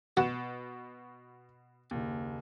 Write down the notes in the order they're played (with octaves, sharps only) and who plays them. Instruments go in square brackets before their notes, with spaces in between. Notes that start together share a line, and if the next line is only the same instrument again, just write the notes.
[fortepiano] B2 [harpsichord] F#4 [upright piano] C#6 E7
[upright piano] F#1 D#2